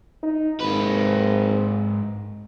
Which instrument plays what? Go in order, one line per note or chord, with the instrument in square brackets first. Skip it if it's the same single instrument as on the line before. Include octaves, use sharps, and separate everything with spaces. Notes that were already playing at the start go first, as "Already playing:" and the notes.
[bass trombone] D#4
[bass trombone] G#1 [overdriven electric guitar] G#2 B4